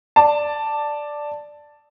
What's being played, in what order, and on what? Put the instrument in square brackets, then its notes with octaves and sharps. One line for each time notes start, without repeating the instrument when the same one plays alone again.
[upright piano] D5 A5